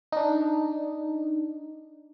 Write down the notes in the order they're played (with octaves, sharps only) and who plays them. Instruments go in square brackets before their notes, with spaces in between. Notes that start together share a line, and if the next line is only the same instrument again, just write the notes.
[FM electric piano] D4 D#4